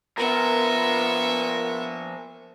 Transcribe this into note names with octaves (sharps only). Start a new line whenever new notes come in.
F3 B3 A#4 E5